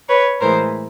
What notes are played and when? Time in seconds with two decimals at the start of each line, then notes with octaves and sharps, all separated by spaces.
0.08 B4 C#5
0.40 A2 E3 G#3 A#4 C5